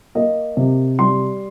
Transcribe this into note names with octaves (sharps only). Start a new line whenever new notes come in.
A#3 D#5
C3
G3 C6